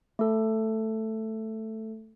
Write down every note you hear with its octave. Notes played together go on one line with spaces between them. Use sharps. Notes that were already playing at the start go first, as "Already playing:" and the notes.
A3 A4